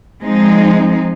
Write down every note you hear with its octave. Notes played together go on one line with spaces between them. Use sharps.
F3 G#3 C4 D#4